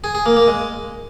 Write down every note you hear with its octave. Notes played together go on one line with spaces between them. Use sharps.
G#4
G#4
A#3
A#3
G#3